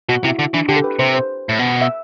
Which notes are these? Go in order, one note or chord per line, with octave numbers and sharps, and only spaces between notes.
B2 F#4
C3 E4
D3 E4
E3 D4
D3 G4
A4
B4
C3 C5
C5
A2
B2
E5